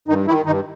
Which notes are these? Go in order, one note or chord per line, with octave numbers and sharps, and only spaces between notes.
G2 D#3 D#4
D#3 E3 E4
G2 D#3 D#4